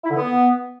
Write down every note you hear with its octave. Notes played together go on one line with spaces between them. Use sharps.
E4
D3
B3